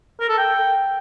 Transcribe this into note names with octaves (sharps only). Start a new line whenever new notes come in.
A#4
A4
G5